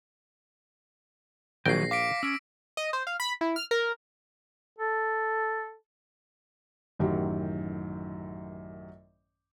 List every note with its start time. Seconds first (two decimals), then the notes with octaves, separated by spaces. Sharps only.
1.66 A#1 D#3 F#3 F#4 G5 A#6 C7
1.91 F5 D6 B6 D7
2.23 C#4 E6 D7
2.77 D#5
2.93 C5
3.07 F5
3.20 B5
3.41 E4
3.56 F6
3.71 A#4
4.79 A4
6.99 A1 F#2 D#3 F#3 G4